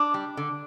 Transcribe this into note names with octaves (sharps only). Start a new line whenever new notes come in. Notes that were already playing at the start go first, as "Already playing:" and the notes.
Already playing: D4
G3
D3